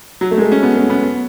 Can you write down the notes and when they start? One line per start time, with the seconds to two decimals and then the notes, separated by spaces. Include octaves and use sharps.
0.21 F#3
0.31 A3
0.38 G#3
0.42 A3
0.52 C#4
0.63 B3
0.77 A3
0.90 B3